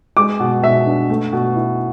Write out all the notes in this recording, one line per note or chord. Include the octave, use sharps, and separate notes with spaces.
G#3 D6
B2
B2 E5
D4
A3
B2
E4